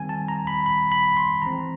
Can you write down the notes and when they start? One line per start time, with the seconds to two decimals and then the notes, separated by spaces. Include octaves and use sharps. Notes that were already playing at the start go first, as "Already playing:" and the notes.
Already playing: D#3 G3 C4 G#5
0.09 A5
0.28 A#5
0.47 B5
0.66 B5
0.92 B5
1.17 C6
1.42 E3 G#3 C4 A#5